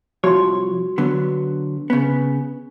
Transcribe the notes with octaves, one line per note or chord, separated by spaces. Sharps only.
C2 F3 F#4 C#5 C6
D3 F#3 B3
C#3 B3